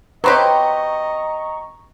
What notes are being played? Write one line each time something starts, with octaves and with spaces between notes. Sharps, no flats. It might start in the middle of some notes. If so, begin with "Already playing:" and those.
F#3 C4 G4 B4 C#5 D#5 A#5 C#6